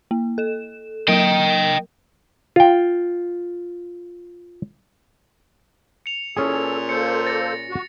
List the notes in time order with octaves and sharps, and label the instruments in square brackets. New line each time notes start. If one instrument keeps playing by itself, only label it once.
[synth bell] A#3
A4 E7
[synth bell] F#3 A#3 A#4 [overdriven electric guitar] D#5 G5
[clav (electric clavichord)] F4 G5
[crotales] C#7 F7
[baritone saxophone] A#2 [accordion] E3 A4 [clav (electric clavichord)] C#4 G#4
[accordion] A#3 A4 C5 [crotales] C#7
[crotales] A6 A#6 C#7
[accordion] F#4